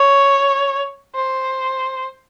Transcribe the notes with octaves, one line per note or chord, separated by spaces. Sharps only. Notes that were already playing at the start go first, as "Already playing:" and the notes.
Already playing: C#5
C5